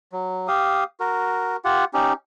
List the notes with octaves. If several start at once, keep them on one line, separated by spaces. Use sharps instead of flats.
F#3
G4 F5 D#6
F#4 A#4
F4 G4 F#5
C#4 D#4 G4